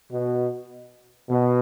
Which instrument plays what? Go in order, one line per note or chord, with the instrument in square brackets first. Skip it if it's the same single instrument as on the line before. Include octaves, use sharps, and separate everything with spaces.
[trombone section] B2
B2